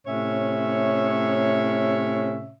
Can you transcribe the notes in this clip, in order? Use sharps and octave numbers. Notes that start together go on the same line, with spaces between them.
A2 C3 C#4 C#5 E5